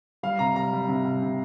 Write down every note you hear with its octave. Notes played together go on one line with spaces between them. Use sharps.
G3 F5
C3 A#5
G3 A#5
G3
C3
G3
C3